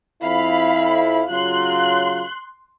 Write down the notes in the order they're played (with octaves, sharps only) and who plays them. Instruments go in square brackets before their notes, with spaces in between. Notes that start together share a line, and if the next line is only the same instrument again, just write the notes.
[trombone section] F2 E4 [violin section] F5 B5
[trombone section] C#3 F#3 F4 [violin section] C6 F#6